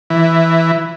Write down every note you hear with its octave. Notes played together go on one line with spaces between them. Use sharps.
E3